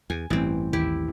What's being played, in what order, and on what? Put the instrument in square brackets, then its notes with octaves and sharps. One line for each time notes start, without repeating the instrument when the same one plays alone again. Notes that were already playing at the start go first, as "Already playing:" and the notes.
[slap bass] E2 [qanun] G#5
[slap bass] A1 G2 [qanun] E3 C4
[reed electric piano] D#2 [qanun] E4 G4